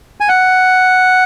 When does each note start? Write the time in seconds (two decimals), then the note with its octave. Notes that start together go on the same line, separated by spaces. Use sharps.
0.20 G#5
0.29 F#5